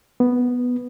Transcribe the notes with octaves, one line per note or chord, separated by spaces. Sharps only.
B3